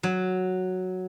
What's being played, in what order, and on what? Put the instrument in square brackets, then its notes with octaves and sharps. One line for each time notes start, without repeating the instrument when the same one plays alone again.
[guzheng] F#3